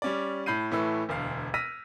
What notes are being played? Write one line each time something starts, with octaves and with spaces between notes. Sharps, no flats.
G3 C#4 D5
A2 B5 G6 C7 D#7
A2 E3 A3 B4 E6
E1 D2 F5
E6 F6 A#6 B6 D#7